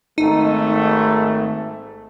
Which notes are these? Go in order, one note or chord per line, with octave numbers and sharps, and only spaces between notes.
G#1 A3 D#4